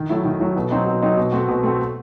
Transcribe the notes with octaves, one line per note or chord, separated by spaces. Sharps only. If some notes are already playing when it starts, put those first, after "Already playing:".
Already playing: D#3
F#3 A3 E4
D#3
F#3 A3 E4
B2
F#3 C4 D#4
B2
F#3 C4 D#4
B2
A3 C4 F#4
B2
A3 C4 F#4